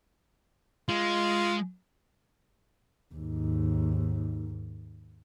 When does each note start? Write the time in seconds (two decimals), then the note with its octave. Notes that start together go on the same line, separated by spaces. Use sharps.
0.89 G#3 F4
3.14 D#2 G#2